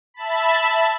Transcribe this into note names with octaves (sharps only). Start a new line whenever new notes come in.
E5 A5 B5